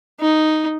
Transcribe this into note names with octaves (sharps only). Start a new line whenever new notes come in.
D#4